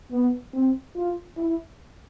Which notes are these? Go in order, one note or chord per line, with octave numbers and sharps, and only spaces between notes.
B3
C4
F4
E4